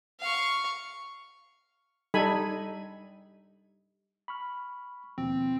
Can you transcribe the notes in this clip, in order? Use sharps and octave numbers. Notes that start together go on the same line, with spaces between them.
F5 C#6
G3 D#4 A4 G#5 B5
B5 C#6 F6
D#2 B2 F3 C4